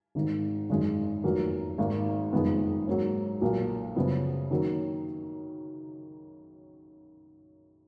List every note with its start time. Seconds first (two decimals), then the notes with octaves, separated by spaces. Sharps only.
0.15 G#1 G#2 D#3
0.69 G#1 F#2 D#3 G#3
1.24 F1 F2 D#3 F#3 A#3
1.78 G#1 G#2 D#3 A#3
2.33 F#1 F2 D#3 G#3 B3
2.87 G#2 F#3 A#3 C#4
3.41 B1 A#2 F#3 A#3
3.96 F#2 C#3 F3 B3
4.51 D#3 F#3 A#3 C#4